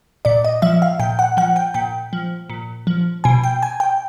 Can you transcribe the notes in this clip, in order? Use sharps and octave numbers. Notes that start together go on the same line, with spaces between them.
A#2 D5
D#5
F3 E5
F5
A#2 G5
F#5
F3 F#5
G5
A#2 G5
F3
A#2
F3
B2 G#5
G5
G#5
G5